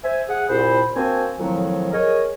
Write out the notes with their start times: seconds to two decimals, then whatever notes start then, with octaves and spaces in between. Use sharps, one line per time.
0.04 C5 E5 G#5
0.29 G#4 F#5
0.49 C2 A#2 C5 B5
0.95 A#3 C4 D4 F#4 G#5
1.39 F2 A2 D#3 F3 F#3
1.92 G#4 A#4 C#5 D#5